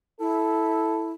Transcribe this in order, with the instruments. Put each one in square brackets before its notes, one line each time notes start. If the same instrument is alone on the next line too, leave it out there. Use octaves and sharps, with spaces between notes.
[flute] E4 [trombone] A4